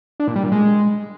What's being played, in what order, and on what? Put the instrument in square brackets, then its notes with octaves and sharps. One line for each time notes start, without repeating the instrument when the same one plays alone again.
[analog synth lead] D4
A#2
G3
A#2
G#3